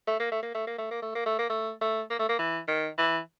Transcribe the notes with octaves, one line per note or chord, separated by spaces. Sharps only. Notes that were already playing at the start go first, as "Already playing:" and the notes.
A3
A#3
A3
A#3
A3
A#3
A3
A#3
A3
A#3
A3
A#3
A3
A3
A#3
A3
A#3
E3
D#3
E3